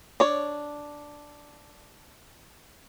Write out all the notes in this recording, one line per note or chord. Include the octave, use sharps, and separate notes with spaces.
D4 C#5